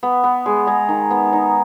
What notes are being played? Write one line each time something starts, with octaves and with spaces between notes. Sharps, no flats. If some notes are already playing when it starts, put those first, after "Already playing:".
B3
B3
G#3
G#3 A#5
D#3
B3
D#4